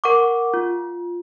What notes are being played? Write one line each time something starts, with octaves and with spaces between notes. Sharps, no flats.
A#4 F#5 C#6 D6
F4